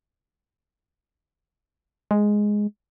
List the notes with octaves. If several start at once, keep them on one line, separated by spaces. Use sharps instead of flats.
G#3